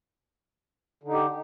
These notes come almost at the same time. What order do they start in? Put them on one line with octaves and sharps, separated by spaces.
D3 D#4 G4